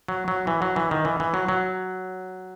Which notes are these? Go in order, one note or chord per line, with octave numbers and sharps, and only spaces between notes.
F#3
F#3
E3
F#3
E3
D#3
E3
E3
F#3
F#3